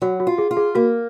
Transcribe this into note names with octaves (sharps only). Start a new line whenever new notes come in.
F#3 F#4
F#4
F4
G#4
F4
G#4
A#3 F#4